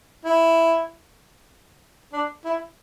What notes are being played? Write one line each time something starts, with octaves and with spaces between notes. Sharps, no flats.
E4
D4
E4